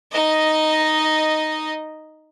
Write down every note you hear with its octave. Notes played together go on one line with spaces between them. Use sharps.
D#4 D#5